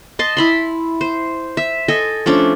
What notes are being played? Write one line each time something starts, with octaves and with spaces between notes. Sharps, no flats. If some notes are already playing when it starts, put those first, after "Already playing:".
D#5 A5 C6
E4 B5 C6
C5
E5
A4 D#5 G#5
F3 A3 C#4 D4